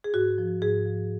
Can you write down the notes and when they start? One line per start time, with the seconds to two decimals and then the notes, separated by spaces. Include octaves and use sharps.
0.04 G#4
0.14 G#2 F#4
0.38 F3
0.62 G#2 G#4
0.85 F3